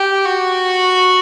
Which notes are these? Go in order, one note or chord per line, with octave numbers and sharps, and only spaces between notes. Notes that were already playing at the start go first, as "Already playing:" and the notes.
Already playing: G4
F#4